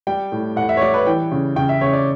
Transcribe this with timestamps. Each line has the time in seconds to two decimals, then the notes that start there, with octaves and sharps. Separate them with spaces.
0.07 G3 G5
0.32 A2
0.56 A2 F#5
0.69 E5
0.77 C#5
0.82 G3 D5
0.94 B4
1.06 E3 G5
1.32 C#3
1.56 C#3 G5
1.69 E5
1.81 C#3 C#5
1.93 D5